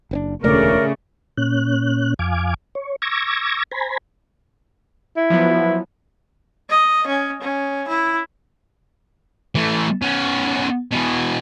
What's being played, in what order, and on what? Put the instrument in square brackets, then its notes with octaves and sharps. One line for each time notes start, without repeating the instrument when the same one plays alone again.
[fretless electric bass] F#1 C4 D4
[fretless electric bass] E1 D2 [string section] C#3 [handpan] A3 D5 [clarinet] A#4
[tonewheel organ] A#2 C#4 F#6
F2 F5 G#5 D6
C#5
C#6 D6 E6 G#6 A#6
C5 G#5 A#5 B5
[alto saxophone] E4
[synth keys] F3 F#3 B3
[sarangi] D#5
C#4
C#4
E4
[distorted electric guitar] E3 A3
B3 C#4
B2 E3